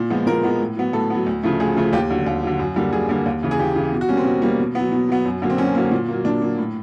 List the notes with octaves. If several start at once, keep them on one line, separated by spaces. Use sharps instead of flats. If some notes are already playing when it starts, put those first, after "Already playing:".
Already playing: A#2
F3 G#3 B3
A#2 A#4
F3 G#3 B3
A2
F#3 B3
A2 A4
F#3 B3
D2
C#3 F3 A3
D2 G#4
C#3 F3 A3
D#2 G4
D3 F#3
D#2
D3 F#3
F#2
D3 G3 A#3
F#2 G#4
D3 G3 A#3
D#2
C#3 E3
G#4
D#2 G4
C#3 E3
B2
F#4
G3 A#3 C#4
C4
B2
G3 A#3
B2
F#3 B3
B2
F#3 B3
F#2
D3 F#3 A#3
C4
F#2 C#4
D3 F#3 A#3
A#2
F#3 A#3
A#2 D4
F#3 A#3
A2